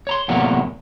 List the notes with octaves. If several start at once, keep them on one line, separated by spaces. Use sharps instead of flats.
C#5 A#5 C6
E2 A2 C3 F#3 A#3 F#5